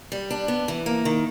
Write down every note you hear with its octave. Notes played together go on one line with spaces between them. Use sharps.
G3
D4
B3
E3
A#3
D#3